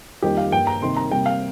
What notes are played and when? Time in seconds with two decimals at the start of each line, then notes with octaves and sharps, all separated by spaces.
0.22 F2 D#3 G3 A#3 G4
0.37 F5
0.52 G2 G3 A#3 G5
0.67 A#5
0.82 C3 D#3 A#3 C6
0.97 A#5
1.11 C3 G3 A#3 G5
1.26 F5